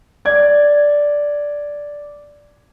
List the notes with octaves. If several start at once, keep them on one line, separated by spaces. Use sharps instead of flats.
D5 G#6